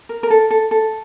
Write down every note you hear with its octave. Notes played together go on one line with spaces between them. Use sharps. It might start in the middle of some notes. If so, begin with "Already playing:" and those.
A#4
A#4
A4
A4
A4